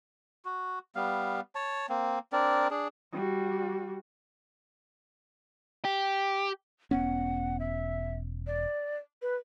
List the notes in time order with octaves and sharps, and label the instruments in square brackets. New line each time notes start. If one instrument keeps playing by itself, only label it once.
[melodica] F#4
G3 B3 F5
C#5 A5
A#3 C4
C4 D4 A#4 D5
D4 G#4
[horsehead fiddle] G3 F#4
[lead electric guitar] G4
[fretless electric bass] E1 B3 C#4 [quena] F#5
[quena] E5
D5
B4